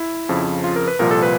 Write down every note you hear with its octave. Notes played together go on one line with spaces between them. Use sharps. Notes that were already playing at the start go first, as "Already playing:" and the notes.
Already playing: E4
F2 C#3 F3
F4
A#4
B4
C2 A#2 F3 A#4
A4
B4